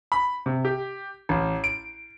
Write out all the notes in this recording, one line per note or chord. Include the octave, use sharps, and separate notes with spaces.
B5
C3
G4
A1
D7